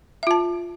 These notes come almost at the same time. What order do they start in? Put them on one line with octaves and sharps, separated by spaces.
E5 F4 A5